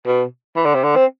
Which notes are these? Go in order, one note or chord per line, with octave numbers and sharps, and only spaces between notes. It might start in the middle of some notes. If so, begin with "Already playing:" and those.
B2
E3
D3
C3
D3
C4